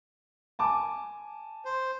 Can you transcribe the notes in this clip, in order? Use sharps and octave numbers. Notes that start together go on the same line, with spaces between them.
G#5 A5 D6
C5